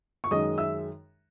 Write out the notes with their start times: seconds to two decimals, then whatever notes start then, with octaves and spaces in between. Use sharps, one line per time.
0.24 C#6
0.31 F#2 D#3 G#3 D#5 D#6
0.58 E5 E6